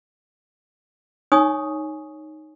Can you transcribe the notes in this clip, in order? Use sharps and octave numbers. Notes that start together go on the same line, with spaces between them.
D#4 C#5 G#5 C#6 D#6